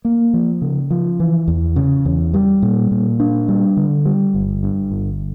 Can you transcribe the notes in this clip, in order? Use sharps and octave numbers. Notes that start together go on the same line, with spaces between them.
A#3
F3
C#3
F3
E3
E2
C#3
E2
G3
A#2
A#2
D4
G3
D3
G3
G1
G2
G1